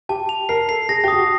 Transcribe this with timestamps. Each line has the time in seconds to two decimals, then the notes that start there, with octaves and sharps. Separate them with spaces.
0.09 G4 A5
0.29 F7
0.49 A#4 C7
0.69 A4 C7
0.89 G#4 A#6
1.04 G4
1.08 F#4 D#6
1.18 G4